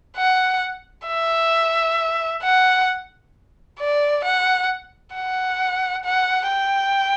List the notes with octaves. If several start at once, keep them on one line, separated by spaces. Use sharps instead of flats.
F#5
E5
F#5
D5
F#5
F#5
F#5
G5